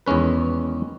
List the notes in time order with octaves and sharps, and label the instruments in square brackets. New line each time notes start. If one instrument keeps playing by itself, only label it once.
[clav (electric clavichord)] E2 D#3 G#3 C#4 B4